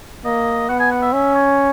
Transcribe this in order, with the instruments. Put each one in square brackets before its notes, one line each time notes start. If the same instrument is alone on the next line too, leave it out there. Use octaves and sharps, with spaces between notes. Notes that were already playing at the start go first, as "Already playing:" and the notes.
[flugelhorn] A#3 [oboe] D#5
[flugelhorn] B3 [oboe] F#5
[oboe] G#5
F#5
E5
[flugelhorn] C#4 [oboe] E5
[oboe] C#5